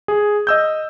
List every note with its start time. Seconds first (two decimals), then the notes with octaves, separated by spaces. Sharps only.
0.08 G#4
0.47 D#5 E6 G6